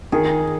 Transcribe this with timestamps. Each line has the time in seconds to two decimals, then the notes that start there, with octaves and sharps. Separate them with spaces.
0.12 D#3 G#4